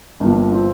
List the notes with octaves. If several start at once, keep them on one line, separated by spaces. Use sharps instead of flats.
G1 G2 F3 A#3 D4
C4 F4